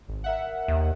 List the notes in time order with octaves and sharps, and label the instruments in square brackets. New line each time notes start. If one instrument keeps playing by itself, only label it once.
[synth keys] G#1
A#4 E5 F#5
[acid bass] D#2